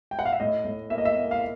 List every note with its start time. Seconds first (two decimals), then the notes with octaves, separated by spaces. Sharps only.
0.11 G5
0.19 F#5
0.25 F5
0.33 E5
0.40 A2 D#5
0.65 A2
0.90 A#3 E5
0.98 D#5
1.05 E5
1.16 A#3
1.31 F5